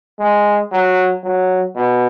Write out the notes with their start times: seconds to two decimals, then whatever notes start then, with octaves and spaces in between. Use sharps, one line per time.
0.19 G#3
0.72 F#3
1.23 F#3
1.76 B2